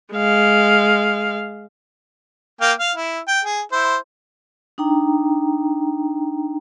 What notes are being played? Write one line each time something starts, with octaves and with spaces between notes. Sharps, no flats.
G#3 F5
A#3 F5 G5
F5
E4
G5
G#4
E4 C5
D4 D#4 G5 A#5